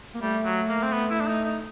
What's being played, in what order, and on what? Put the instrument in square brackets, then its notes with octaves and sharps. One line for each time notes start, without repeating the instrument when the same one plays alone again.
[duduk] A#3
[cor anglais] G3 [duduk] A3
[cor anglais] F#3
A#3
C4
B3
E4
D4
D#4
D#4